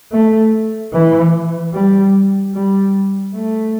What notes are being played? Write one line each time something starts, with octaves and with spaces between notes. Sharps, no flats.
A3
E3
G3
G3
A3